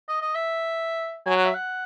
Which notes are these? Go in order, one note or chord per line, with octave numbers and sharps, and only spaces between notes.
D#5
D#5
E5
F#3 G#5
F#5
E5
F#5